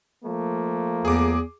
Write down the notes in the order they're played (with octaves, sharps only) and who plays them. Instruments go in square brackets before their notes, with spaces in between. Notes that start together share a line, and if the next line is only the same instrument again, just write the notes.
[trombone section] F3 A3 A#3
[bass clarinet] E2 [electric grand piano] G#4 D6